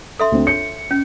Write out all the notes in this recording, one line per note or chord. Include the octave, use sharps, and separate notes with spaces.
A4 E5 C6
D2 C4
C#5 C#7
C#4